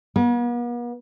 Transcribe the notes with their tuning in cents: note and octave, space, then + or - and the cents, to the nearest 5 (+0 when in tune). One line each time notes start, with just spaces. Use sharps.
B3 -45